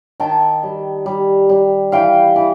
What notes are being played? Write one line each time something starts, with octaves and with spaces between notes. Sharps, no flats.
D#3 G5 A5
G3
G3
G3
E3 F5 G5
E3